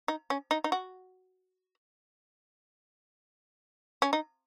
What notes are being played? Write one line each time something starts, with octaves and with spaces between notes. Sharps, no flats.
D#4
C#4
D#4
D#4
F#4
C#4
D#4